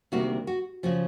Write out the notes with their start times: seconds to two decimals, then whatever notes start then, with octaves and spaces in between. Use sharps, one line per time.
0.12 D2 C3 D#3 G3 A#3 F#4
0.47 F#4
0.83 C#3 F3 F#4